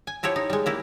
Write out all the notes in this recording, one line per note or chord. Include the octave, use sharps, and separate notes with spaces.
G#5
F3 E4 G4 C#5
D#4
G3 G#3
A#3 E4 G4